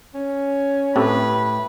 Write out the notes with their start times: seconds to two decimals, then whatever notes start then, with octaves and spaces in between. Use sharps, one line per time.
0.14 C#4
0.96 A2 C4 G4 A4 B4